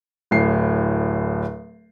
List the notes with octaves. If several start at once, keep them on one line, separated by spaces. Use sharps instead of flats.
D1 A2 C7